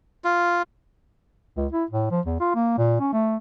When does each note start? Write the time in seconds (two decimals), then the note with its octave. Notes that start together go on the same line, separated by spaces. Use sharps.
0.24 F4
1.57 C#2
1.72 E4
1.91 A2
2.11 F3
2.26 E2
2.40 F4
2.55 A#3
2.78 A#2
3.00 C#4
3.13 A3